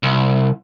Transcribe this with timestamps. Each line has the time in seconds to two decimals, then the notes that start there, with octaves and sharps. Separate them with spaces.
0.03 C2